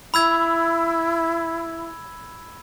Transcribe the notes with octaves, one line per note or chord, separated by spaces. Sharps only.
E4 B5 E6 G#6